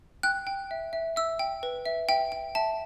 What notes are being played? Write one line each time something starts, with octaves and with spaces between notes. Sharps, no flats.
G5 F#6
G5
E5
E5
E5 E6
G5
B4
E5
E5 G5
G5
E5 A5